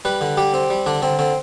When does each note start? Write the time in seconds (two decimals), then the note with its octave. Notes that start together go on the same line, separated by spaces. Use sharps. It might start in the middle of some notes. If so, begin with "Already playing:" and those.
0.05 G3 B4
0.21 D3
0.37 G3 G4
0.54 C4
0.70 G3
0.86 D3 D4
1.02 D3 C4
1.19 D3 C4